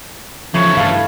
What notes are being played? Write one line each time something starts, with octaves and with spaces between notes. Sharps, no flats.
A2 C#3 E3 F3 C#5
G2 A4 F5